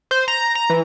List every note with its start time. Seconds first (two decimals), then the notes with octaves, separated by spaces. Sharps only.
0.11 C5
0.28 A#5
0.55 A#5
0.70 E3